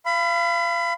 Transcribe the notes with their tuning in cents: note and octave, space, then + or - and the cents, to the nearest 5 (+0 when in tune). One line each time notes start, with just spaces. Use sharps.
F5 -30 B5 +25